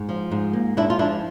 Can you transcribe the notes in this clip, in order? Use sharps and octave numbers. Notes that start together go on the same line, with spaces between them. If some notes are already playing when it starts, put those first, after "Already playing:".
Already playing: G#2
F3
G#2
A#3
G#2 D4 E4
F4
F3 D4 E4